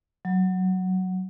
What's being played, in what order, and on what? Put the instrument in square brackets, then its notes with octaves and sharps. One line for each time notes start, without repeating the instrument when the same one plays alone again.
[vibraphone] F#3